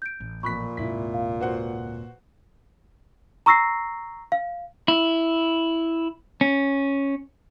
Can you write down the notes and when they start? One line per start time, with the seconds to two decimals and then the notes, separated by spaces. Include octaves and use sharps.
0.02 G6 D7
0.20 A1
0.43 F2 A#2 B5 C#6 F#6 B6
0.77 D1 G#2 C3 E4 B6
1.14 F5
1.40 F#4 B4 C5 F#5
3.46 A#5 C#6 E6 A#6 C7
4.32 F5
4.88 E4
6.41 C#4